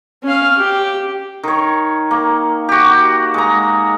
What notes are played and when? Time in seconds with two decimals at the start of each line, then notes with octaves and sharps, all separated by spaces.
0.24 C#4 F5
0.57 G4
1.43 D#3 C#5
2.11 A#3
2.69 F#4 G4
3.34 G#3 A#5